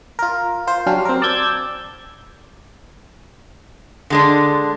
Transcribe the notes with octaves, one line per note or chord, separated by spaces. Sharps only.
F4 A#4
F4 C5
F#3 C#4 D4 G4 F5
C4 A#4
D5 A5 D6 E6 G6 G#6
D3 G#3 D4